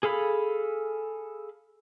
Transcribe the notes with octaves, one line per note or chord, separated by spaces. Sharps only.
G#4 A4 F5 B5